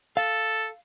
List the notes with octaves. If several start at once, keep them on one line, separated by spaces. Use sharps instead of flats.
A4 F5